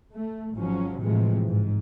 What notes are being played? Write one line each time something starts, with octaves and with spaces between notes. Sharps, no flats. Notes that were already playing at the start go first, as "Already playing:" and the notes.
A3
G#1 F3 F#3 C#4
A2 C3 E3 F3 G#3
G#2